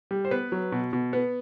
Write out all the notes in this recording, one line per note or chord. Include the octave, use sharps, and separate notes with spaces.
G3
C5
B3 B4
F#3
B2
B2
B3